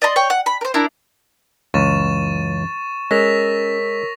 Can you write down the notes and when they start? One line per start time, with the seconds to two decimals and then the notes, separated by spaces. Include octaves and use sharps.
0.02 D5 D#5 A#5 C6
0.16 C#5 G5
0.30 F#5
0.46 B5
0.61 A#4 C5
0.74 D4 E4 A#4
1.74 C#2 F#2 E3 C#4 C#6 A6 E7
3.11 G#3 C#4 A#4 C#5 E6 A#6 B6 F7